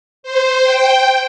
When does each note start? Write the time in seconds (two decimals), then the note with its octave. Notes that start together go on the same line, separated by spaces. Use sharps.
0.23 C5
0.64 G5